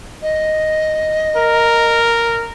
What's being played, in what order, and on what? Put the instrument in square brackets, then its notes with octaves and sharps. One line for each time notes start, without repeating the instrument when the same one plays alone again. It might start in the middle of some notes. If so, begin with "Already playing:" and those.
[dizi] D#5
[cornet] A#4